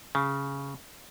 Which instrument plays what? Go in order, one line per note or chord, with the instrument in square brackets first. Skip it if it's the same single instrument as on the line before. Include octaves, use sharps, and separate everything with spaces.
[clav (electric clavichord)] C#3